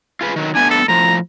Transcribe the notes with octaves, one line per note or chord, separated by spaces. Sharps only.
F4 G#4 B4
D#3 F#3
A3 B3 D4 G#5
A4
A2 F3 A#5